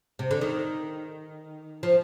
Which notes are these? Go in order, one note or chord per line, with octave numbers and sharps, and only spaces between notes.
C3
D3
D#3
F3